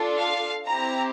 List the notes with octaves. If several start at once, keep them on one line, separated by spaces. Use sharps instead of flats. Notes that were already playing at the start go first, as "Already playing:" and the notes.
Already playing: D4 F4 A4
F5
C4 E4 G4 A#5